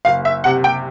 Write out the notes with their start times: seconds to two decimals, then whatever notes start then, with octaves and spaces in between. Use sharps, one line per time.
0.05 F#1 F5
0.25 E5
0.44 C3 F#5
0.64 G5